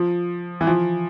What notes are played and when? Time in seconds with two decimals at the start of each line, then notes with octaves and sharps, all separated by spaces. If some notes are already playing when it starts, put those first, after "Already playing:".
Already playing: F3
0.61 E3
0.67 F3